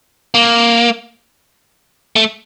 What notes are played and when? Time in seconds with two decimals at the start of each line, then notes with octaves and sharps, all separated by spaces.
0.34 A#3
2.16 A3